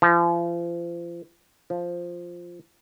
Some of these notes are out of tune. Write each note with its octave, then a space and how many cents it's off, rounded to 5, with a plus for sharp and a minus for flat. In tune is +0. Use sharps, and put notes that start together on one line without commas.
F3 -35
F3 +0